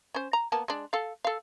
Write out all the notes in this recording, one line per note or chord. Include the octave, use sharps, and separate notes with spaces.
C#4 C5
A#5
A#3 B3 A5
G#3 D4
A4 F5
A4 F5